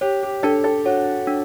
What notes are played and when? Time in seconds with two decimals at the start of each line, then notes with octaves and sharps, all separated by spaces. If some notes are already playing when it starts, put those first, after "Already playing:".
0.01 G4 C#5
0.23 G4
0.43 D4 A4
0.64 A4
0.85 F#4 C#5
1.27 D4